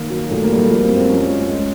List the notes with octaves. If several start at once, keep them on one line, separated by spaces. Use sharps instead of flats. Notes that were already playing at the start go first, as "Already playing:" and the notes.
Already playing: D#3 A#3
F#3
A#2 A3
A#3
G3
A3
F3 A#3
C4
F#2
C4
F3 C#4
G#3
G#3